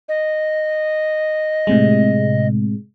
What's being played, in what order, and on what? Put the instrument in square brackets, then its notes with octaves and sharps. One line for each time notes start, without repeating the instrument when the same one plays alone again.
[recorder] D#5
[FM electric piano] A2 C3 G#3